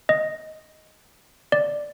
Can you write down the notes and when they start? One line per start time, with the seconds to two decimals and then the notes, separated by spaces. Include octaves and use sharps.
0.09 D#5
1.52 D5